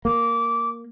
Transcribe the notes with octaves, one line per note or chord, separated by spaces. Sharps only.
A#3 D6